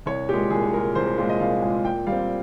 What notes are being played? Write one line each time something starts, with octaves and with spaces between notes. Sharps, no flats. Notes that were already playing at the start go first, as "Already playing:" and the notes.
C2 C#5
A#2 G#3 G4
C2 G#4
A#2 G#3 A#4
C2 C5
A#4
A#2 G#3 F4
D#5
C2 F5
A#2 G#3
A#2 G5
G3 F5
C4